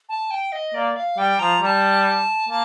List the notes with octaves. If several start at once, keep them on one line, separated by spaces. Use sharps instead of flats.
A5
G5
D#5
A#3 D5
F5
G3 G5
F3 A#5
G3 A5 A#5
A#3 A5